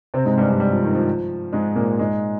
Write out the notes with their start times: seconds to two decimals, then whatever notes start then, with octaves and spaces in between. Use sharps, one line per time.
0.14 C3 C4
0.25 G#2 G#3
0.37 G2 G3
0.49 G2 G3
0.60 G3
0.72 F3
0.83 D#3
0.95 F3
1.53 G#2 G#3
1.76 A#2 A#3
1.99 G#2 G#3